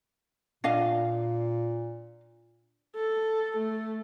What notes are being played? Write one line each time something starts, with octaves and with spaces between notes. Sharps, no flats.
A#2 D4 D#5 F5
A4
A3